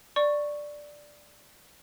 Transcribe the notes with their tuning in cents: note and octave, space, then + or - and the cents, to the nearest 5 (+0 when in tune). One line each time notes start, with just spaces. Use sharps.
D5 +5 C#6 +0